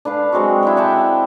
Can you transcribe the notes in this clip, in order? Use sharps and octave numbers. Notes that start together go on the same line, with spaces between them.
D4 B4 F5 A5
F#3 G#3 C4 F#4
E4 E5 G5
D5 F#5 G5 A5